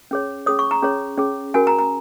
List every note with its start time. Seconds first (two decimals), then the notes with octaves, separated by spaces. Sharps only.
0.11 C#4 G#4 C#5
0.46 C#4 G#4 C#5 D#6
0.59 C#6
0.71 A#5
0.82 C#4 G#4 C#5
1.18 C#4 G#4 C#5
1.54 C#4 F#4 A#4 G#5
1.67 A#5
1.79 A#5